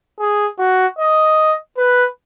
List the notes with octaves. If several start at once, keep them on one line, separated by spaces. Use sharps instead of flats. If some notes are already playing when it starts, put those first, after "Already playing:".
G#4
F#4
D#5
B4